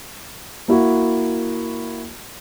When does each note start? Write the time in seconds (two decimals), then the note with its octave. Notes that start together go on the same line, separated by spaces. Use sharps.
0.68 A#3 E4 F#4